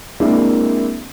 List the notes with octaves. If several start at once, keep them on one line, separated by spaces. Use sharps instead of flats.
G#3 A#3 C4 D4 E4 A#4